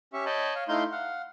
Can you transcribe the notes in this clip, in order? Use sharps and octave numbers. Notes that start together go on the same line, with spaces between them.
C#4 G4 E5 C#6
C#5 D#5 G5 A5 B5
C#5 F5
A3 D#4 E4 F5 C6 G6
F5 F#5